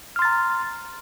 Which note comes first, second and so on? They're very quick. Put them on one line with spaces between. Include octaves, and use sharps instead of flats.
F6 C6 A6 A#5